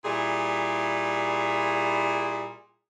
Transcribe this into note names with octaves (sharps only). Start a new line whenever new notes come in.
A#2 G3 E4 G#4